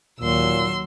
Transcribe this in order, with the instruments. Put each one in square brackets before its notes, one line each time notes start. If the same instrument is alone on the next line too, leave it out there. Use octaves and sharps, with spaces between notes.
[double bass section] D#2 F#3 [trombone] A#2 [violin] C6 E6